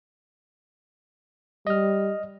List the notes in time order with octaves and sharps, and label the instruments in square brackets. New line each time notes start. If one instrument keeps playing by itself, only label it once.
[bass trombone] G3 [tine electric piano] D#5 F6